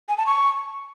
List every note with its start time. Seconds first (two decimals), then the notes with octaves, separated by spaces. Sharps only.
0.09 G#5
0.18 A5
0.26 C#6